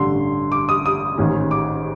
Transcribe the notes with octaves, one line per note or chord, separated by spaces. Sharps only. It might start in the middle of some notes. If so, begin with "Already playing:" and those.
Already playing: A1 G2 D3 C6
D6
D#6
D#6
A1 G#2 D#3 G#3 C#4
D6